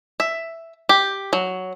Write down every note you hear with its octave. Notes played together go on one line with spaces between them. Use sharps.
E5
G4
F#3